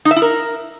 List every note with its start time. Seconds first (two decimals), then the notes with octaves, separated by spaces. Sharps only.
0.05 D#4
0.11 E5
0.16 E4
0.22 A#4